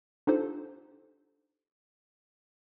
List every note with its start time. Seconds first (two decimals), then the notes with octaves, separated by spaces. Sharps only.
0.27 D4 D#4 F4 G4 A4 C5